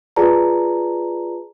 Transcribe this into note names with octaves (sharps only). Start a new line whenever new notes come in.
F4 G#4 B4 D5 A5 A#5